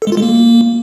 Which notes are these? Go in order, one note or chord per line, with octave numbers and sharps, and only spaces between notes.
A4
G#3
F4
G#3
A#3